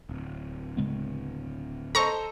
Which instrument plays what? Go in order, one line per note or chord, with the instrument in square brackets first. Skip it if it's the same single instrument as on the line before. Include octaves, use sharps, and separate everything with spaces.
[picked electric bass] D1
[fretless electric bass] C#3 G#3 B3
[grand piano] A4 C5 D#5 [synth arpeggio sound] A#5 C#6